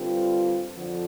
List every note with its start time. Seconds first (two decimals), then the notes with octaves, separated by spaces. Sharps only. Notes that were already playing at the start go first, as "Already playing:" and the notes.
Already playing: D3 G3 C4 F4 B4
0.75 F2 D3 F3